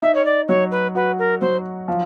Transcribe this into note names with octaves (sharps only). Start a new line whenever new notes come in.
D#4 E5
C#5
D5
F#3 C#5
B4
F#4 B4
A#4
F#3 C5
F3